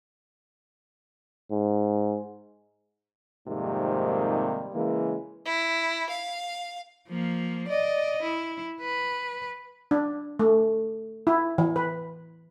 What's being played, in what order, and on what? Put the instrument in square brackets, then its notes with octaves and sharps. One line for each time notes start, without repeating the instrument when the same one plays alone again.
[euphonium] G#2
[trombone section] F2 G#2 C3 D#3 G3 A#3
C#3 E3 G#3 A#3
[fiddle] E4
F5
[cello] F3 A#3
D5 D#5
E4
B4
[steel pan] D4
A3
E4
E3
B4